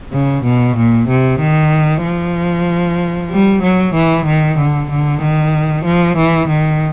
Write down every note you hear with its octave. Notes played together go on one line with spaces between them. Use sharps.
C#3
B2
A#2
C3
D#3
F3
G3
F#3
E3
D#3
D3
D3
D#3
F3
E3
D#3